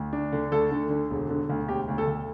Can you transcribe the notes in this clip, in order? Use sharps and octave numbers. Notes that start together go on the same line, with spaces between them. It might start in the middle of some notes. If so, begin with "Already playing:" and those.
Already playing: D2
D4
D3
D2 A4
D3
D3
E1
D3
D2
E1 G4
D2
A4
D2